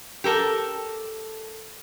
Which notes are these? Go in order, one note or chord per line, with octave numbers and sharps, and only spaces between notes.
G4 A4 A#4 A5